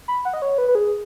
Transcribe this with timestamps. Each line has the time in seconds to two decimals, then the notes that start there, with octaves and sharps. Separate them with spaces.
0.08 B5
0.25 F#5
0.34 D#5
0.42 C#5
0.58 B4
0.68 B4
0.75 G#4